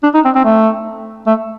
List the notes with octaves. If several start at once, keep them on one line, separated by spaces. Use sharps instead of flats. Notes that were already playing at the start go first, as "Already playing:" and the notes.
D4
D#4
C4
C4
A3
A3